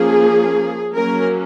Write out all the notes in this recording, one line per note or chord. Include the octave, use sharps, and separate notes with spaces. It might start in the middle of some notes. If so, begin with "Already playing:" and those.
Already playing: F3 A#3 C#4 G#4
F#3 A#3 C#4 A#4